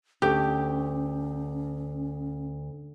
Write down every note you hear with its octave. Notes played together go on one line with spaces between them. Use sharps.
D2 C#4 G4